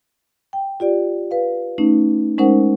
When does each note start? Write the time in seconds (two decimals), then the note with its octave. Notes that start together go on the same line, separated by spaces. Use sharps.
0.53 G5
0.80 F4 G4 D5
1.31 B4 F5
1.78 A3 C#4 D#4
2.38 G#3 C#4 D#4 A#4 C5 F#5